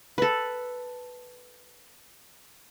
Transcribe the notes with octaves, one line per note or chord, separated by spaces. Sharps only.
A4 B4